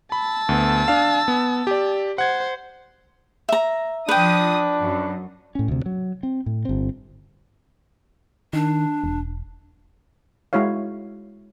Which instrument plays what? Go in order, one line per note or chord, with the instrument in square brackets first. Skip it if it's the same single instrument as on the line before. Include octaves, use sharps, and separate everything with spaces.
[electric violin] A5 E6 [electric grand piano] B5
[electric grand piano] D2 B3
D4 F5
B3
G4 D5
[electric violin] C5 [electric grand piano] F#5 G#6
[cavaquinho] E5 A#5
[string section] F3 D#6 [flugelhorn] D4 [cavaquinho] B4 G5
[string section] F#2
[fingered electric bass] A2 C#4
D2 C3
F#3
C4
A2
G1 C4
[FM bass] D#3 [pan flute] D4
[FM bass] E1
[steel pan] G#3 E4 F#4 C#5 F5